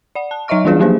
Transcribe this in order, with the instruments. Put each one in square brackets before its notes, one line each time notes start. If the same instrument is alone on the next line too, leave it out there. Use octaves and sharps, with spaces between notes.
[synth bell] D5 F#5
A5
F#3 C#5 D#5 E5 C#6 F6
E3 G3 B3 D4 F4 G#4
F3 F#3 A#3 D4 G#4 C5